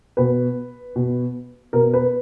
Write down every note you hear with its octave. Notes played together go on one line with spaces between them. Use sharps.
B2 B4
B2
B2 A#4
B4